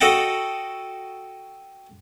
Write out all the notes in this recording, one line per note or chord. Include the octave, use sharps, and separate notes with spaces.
F#4 A4 D#5 F#5 G5 A5